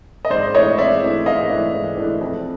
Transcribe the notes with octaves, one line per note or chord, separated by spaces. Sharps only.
D#5
G#2 C5 D5
E3 A3 D4 C#5 D#5
G#2 D5 E5
E3 A3 D4
G#2 D#5 F5
E3 A3 D4
G#2
E3 A3 D4
F2